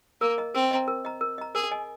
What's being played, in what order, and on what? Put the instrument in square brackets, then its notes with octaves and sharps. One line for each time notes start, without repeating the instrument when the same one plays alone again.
[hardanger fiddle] A#3 [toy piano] A#4
[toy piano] D#5 A#5
[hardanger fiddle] C4 [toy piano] A#4
[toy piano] D#5 A#5
A#4
D#5 A#5
A#4
D#5 A#5
[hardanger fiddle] G#4 [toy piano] A#4
[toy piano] D#5 G#5